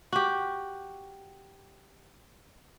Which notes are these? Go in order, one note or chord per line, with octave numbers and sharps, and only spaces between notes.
F#4 G4